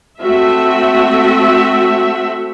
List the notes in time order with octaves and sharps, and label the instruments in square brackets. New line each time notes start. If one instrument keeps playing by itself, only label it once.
[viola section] A3 C4 F#4 E5